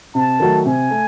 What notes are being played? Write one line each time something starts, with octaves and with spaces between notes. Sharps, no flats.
C3 A5
D#3 F#3 A3
C3 G#5
A3